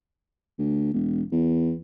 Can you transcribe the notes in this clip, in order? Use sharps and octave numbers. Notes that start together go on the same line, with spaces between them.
D2
E1
E2